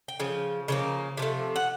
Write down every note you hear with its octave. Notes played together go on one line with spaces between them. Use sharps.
G5
C#3 F3
C#3 F3 A#3
C3 F3 A3
F#5